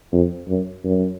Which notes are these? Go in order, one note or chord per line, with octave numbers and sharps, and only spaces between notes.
F2
F#2
F#2